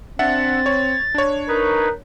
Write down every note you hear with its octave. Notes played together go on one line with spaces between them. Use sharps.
C4 D4 E5 F#5 A6
C#5
D4 C#5
D#4 A#4 B4